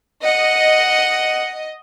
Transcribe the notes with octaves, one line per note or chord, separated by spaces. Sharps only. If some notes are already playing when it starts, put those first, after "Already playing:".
D#5 F#5